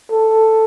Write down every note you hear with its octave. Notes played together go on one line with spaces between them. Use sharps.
A4